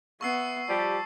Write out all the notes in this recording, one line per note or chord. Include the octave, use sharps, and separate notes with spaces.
B3 E5 C#6 E6 C7
F3 G3 G4 A5